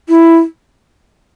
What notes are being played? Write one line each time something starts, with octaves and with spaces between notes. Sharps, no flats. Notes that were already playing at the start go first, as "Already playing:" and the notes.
E4